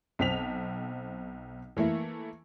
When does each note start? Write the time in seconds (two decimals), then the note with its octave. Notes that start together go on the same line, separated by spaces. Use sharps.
0.19 B1 C4 B6 F7
1.77 E3 A3 A#3 E4